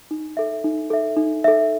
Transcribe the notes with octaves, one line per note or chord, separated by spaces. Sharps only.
D#4
A4 E5
D#4
A4 E5
D#4
A4 E5